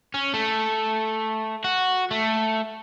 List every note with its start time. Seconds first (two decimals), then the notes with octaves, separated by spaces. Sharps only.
0.14 C#4
0.34 A3
1.64 F#4
2.11 A3